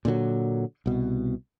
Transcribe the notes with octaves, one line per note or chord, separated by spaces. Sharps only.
A#2 D3 E3 F#3
C2 B2